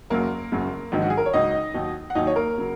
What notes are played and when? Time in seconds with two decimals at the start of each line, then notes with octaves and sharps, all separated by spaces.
0.10 F#1 F#2 F#3 A#3 A#4
0.52 F#1 F#2 C#3 F#3
0.92 A#1 G#2 D#3 F#3
1.02 F#4
1.10 G#4
1.17 A#4
1.26 C#5
1.33 C#2 C#3 F#3 D#4 D#5
1.74 D#2 D#3 F#3
2.10 F#5
2.15 D#2 D#3 F#3 D#4 D#5
2.27 C#5
2.36 A#3 A#4
2.58 C#3 F#3